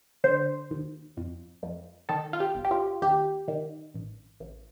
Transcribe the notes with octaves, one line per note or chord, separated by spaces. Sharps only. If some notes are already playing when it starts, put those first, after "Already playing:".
D3 C5
D#2
F2
F2
D#3 A4
F4
G4
G1
G4
F4
D#2 G4
D#3
A1
A1